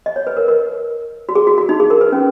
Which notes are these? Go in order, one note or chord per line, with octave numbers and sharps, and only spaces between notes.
D#5
C#5
B4
A#4
A#4
F#4
G#4
F#4
F#4
D#4
G#4
A#4
B4
C#4